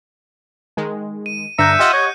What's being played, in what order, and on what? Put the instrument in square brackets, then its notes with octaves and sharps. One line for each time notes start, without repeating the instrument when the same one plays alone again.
[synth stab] D#3 G#3
[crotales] D#7
[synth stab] G2 D3 D4 [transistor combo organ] E5 [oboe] A#5 [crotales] F#6 G6 C#7
[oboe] F4 [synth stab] G4 D#5 F#5
[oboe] C#5